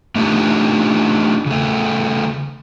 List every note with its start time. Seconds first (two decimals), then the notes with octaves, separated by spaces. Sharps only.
0.16 A3 D4 D#4 F4 G4
1.46 C#3 A3